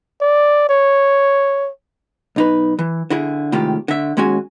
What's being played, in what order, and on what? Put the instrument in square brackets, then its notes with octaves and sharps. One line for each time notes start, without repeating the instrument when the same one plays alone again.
[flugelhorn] D5
C#5
[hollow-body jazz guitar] B1 D#4 B4
E3
D3 E4 G#4
A2 C3 D#3 G#3 F4 G4
D3 E5
D#2 G#3 C#4 F#4 G#5